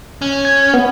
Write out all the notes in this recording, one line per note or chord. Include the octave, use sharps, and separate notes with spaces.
C#4
G#6
B3